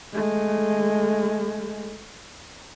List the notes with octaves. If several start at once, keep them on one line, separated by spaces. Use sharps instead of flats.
G#3 A3